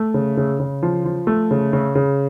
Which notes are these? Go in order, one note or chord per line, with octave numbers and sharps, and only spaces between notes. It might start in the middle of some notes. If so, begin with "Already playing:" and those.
Already playing: A3
C#3
C#3
C#3
F3
F3
A3
C#3
C#3
C#3